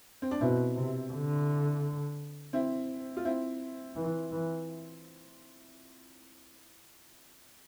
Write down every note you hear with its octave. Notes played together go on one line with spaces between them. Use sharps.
C4
D4
B2 C4 E4
C3
D3
C4 E4
F4
C4 E4
E3
E3